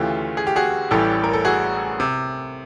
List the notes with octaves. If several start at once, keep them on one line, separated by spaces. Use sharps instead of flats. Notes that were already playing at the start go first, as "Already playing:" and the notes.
Already playing: D2 C#3 E3 A3 F4 G4
G#4
G4
F#4 G#4
A1 A2 E3 G3 G4 A4
A#4
A4
F#4 G#4
C3